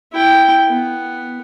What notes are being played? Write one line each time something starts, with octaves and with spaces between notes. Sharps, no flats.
E4 G5
B3